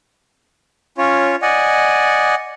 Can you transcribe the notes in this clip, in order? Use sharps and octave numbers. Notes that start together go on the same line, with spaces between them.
C#4 F4 C#5
D5 D#5 F#5 G#5